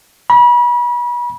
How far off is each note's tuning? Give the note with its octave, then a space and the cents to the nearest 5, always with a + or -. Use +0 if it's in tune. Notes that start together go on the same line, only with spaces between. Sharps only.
B5 -35